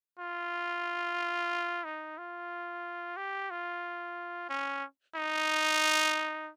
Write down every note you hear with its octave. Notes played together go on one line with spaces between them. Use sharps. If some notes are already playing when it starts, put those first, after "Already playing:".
F4
D#4
F4
G4
F4
C#4
D#4